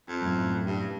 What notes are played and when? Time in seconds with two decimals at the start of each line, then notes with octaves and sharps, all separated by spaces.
0.08 F2
0.22 F#2 A2
0.65 G2